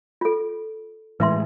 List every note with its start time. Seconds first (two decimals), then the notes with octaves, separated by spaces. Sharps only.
0.21 F4 A4
1.20 A2 E3 G#3 B4 E5 C6